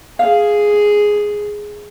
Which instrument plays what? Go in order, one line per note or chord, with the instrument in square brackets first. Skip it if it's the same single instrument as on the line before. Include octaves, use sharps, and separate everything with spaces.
[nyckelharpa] G#4 [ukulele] F5